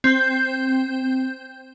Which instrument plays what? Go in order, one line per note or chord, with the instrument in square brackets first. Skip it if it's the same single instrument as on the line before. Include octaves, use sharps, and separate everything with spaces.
[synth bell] C4 G6